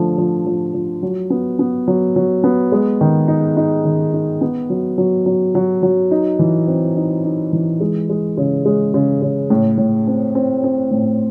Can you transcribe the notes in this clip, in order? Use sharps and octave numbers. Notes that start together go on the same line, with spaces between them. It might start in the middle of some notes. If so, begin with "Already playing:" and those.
Already playing: D3 F3 A3
F3
F3
F3
F#3
B3
B3
F#3
F#3
B3
G#3
D#3
D#4
D#4
D#3
D#4
B3
F#3
F#3
F#3
F#3
F#3
D#4
E3
C4
D#4
D#4
E3
G#3
G#3
C#3
G#3
C#3
C#3
A2
A2
C4
C4
C4
A2